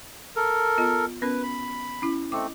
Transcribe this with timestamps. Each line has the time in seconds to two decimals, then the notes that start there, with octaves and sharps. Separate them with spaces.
0.36 A4 A#4
0.78 B3 F4 D#5
1.22 B3 C#4 A#4 B4
1.43 B5
2.02 C#4 E4
2.32 A3 C4 D#5 D6